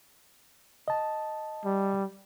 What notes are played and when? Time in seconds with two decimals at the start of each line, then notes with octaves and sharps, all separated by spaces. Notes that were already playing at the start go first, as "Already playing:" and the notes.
0.88 D#5 A5
1.65 G3